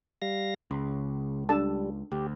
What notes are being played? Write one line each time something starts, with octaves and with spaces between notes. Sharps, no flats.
G3 F5 A#6
C#2 C#3
G3 D4 A4 A5
D2 G4